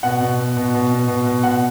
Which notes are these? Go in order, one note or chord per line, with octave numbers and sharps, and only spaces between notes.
B2 F#5
B2
B2
B2
B2
B2
B2
B2
B2 F#5